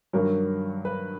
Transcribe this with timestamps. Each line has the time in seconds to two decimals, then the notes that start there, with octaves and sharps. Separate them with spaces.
0.13 G2 D#3 F#3 A#4
0.85 B4